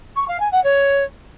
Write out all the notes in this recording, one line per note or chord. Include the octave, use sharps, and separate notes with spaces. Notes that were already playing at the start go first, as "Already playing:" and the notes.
C#6
F5
G#5
F#5
C#5